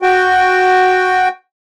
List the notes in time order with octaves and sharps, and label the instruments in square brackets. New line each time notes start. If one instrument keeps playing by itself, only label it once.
[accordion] F#4 G5